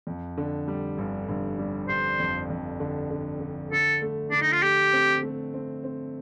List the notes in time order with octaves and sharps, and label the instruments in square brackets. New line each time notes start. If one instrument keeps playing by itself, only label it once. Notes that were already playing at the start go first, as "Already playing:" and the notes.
[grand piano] F2
D3
G3
G1
G1
G3
[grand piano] G1 [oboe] C5
[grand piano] F2
F2
D3
D3
D3
[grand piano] D3 [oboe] A4
[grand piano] A3
[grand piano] D3 [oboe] D4
[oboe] D#4
F4
[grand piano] A3 [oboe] G4
[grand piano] C4
A3
C4
C4